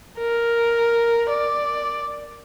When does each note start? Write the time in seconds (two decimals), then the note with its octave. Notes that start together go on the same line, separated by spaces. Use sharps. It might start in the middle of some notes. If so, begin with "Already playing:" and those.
0.19 A#4
1.29 D5